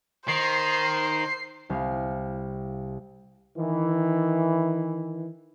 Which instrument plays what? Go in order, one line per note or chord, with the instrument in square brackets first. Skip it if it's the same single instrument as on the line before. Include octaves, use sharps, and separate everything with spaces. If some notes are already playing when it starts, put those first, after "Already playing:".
[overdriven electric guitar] D#3 [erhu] C5 [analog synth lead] C7
[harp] C2 F5
[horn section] D#3 E3